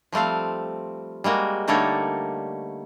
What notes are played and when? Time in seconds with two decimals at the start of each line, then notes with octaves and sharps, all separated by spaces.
0.12 F3 G3 A3 C4 F5
1.24 G3 G#3 A#3 F#4
1.68 D3 G3 A3 A#3 D#4 C#5